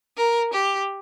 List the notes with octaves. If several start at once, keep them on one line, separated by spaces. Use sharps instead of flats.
A#4
G4